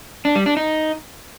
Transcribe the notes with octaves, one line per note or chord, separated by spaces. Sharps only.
D4
G3
D4
D#4